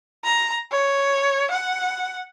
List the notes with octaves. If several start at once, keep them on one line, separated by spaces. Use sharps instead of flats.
A#5
C#5
F#5